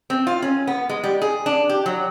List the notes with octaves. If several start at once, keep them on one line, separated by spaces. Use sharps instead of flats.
C4
F4
C#4
B3
G#3
G3
G#4
D4
G4
F#3